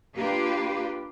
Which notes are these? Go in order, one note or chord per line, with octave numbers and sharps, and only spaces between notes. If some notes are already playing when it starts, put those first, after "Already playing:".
A#3 D4 F4 G4 B4